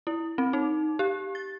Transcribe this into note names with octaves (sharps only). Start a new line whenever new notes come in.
E4
C4
D#4
G4
A6